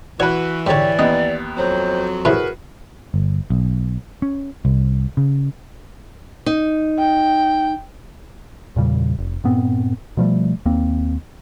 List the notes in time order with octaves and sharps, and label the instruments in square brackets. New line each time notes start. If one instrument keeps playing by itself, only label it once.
[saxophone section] E3 [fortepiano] F#4 B4 [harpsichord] C#5
[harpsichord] G#2 D3 [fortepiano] G4 C#5 [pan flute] D5
[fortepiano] D#2 B3 [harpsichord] D#5
[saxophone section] F2 F#3 [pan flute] C5
[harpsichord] A2 C3 E3 [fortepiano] F#4 G#4 B4 [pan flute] A#4
[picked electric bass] G1
B1
C#4
C2
C#3
[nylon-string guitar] D#4
[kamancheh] G5
[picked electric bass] E2 A#2 C#3 G3
F1
G2 A#2 B3 C4
B2 F3 G3 A3
D#2 A#3 C4